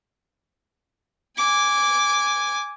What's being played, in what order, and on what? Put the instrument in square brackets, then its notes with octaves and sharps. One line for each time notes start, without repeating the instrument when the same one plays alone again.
[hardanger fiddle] G#5 D6